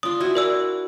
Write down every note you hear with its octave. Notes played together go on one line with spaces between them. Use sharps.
D4 F4 D#6
E4 F#4 G#5
A#4 D5 E6